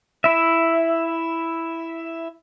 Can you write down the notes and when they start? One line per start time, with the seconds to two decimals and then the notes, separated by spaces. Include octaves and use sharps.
0.24 E4 E5